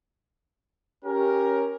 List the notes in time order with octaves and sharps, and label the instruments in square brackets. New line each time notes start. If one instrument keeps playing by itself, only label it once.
[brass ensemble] C#4 G4 A#4